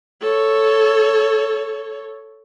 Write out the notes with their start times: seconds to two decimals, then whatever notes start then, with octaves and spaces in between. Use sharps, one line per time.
0.22 A4 C#5